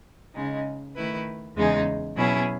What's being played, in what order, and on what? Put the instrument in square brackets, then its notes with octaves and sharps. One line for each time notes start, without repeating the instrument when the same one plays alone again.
[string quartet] C#3 G#3 D#4
D#3 A3 E4 B4
E2 C#3 G#3 D#4 G#4
B2 F#3 C#4 E4 G#4